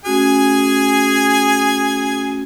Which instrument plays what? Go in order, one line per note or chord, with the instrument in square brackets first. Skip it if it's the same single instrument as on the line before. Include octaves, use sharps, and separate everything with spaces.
[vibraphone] A3 C#4 F#4 [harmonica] G#4 G#5